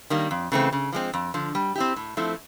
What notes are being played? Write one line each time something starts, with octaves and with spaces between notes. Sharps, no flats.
D#3 G3 A#3
F2
C#3 E3 A3 C4
C#3
F3 G#3 C4
F2
D3 F3
G3
C4 E4 G4
A2
F3 A3 C4 E4